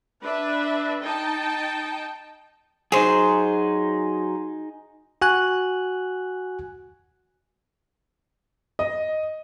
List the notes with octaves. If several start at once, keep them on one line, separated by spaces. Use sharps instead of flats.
D4 B4 E5
D#4 G5 A5
F#3 D#4 G#4 C5
F#4 G#5 F#6
D#5